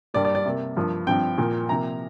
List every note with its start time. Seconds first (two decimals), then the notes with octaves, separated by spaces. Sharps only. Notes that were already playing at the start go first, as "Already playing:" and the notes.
0.14 G2 G3 A#3 D5
0.25 D5
0.35 D5
0.46 C3 A#3
0.77 G2 F3 A#3
1.07 G2 F3 C4 G5
1.38 A#2 F3 A#3
1.69 C3 F3 A#3 A#5